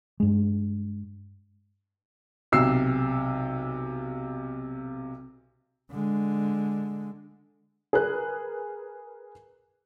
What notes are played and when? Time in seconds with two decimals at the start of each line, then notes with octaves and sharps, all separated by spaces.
0.20 G2 G#3
2.52 B1 C3 E6 C7
5.92 D3 G#3
7.93 G#4 A#4 B4 F#6